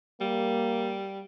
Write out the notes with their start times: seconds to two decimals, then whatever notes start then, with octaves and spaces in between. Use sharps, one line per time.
0.21 G3 A#3